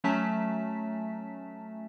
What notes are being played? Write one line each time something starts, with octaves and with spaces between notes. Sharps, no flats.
F#3 A3 C#4 A5 A#5 B6